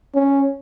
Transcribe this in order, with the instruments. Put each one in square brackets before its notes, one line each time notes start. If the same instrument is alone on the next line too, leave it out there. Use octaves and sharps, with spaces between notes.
[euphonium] C#4